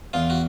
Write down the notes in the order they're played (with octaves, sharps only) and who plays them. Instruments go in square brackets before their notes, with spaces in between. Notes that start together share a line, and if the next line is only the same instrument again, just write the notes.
[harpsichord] E2 F4
F#4